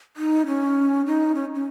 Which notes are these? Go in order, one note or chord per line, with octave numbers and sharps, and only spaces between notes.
D#4
C#4
D#4
C#4
C#4